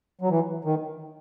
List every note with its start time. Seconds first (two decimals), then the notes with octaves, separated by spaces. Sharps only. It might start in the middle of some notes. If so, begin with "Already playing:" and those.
0.21 F#3
0.29 E3
0.65 D#3